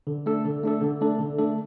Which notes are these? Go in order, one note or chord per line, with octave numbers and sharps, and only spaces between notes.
D3
A3 D4 A4
D3
A3 D4 A4
D3
A3 D4 A4
D3
A3 D4 A4